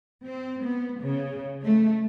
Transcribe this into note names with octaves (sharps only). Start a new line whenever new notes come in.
C4
B3
C#3
A3